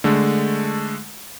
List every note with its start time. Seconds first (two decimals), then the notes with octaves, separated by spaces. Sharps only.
0.04 D3 G#3 A3